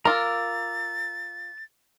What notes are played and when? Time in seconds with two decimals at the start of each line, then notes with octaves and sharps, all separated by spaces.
0.05 F4 A#4 A#5 D6 E6 A6